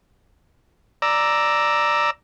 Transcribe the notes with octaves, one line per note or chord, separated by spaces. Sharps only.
D5 A#5 E6